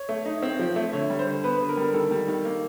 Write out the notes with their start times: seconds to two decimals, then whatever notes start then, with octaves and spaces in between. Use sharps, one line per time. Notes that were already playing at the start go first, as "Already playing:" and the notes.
Already playing: C#5
0.09 A3
0.26 D#4
0.43 C4
0.59 F3
0.76 A3
0.93 D3 C#5
1.10 G3
1.19 C5
1.27 D3
1.44 B3 B4
1.61 D3
1.69 A#4
1.77 G3
1.94 D#3 A4
2.11 G3
2.28 D#3
2.45 A#3